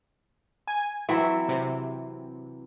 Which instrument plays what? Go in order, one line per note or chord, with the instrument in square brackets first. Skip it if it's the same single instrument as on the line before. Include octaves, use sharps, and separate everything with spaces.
[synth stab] G#5
[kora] E3 F#3 C4 [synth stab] E5
[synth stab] C3